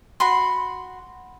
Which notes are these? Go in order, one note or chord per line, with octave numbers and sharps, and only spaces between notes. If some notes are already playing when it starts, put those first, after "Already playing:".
F#4 B5 C6